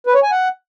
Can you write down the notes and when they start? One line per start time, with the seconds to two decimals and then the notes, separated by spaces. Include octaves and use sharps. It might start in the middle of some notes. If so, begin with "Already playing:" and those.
0.07 B4
0.15 C#5
0.23 G#5
0.31 F#5